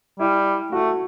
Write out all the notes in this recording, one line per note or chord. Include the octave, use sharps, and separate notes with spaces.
G3 E4
A3 F#4